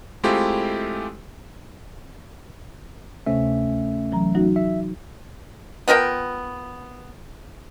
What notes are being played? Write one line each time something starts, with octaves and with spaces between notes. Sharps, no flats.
G#3 A3 C4 E4 F4 G4
D2 C3 A3 C#4 E5
E3 F#3 A#5
F#3 D#4 F#4
E5
B3 F4 A#4 G5